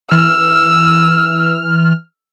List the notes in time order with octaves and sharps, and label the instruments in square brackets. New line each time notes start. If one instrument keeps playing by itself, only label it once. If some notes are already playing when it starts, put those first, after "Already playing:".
[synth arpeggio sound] E3 F6 [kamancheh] E6